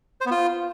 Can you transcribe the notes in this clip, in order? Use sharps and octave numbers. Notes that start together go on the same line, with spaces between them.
C5
B3
F4